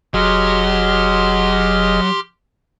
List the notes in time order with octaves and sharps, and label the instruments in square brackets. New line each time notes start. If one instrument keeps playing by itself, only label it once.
[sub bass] F1 [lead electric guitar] F#3 [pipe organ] G4 C6 F6 [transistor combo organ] G#4 D#5